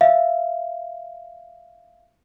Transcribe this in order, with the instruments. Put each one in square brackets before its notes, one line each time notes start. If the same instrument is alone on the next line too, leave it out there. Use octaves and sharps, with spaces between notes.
[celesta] E5 F5